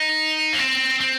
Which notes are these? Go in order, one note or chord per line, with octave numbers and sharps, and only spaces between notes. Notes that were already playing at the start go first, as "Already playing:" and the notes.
Already playing: D#4
A#3
C4
C4